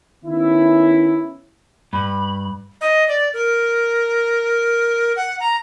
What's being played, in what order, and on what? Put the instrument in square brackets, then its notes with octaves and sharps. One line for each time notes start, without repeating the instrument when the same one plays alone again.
[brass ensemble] D#3 B3 C#4 E4
[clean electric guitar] G2 [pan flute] B5
[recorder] D#5
D5
A#4
F#5
A#5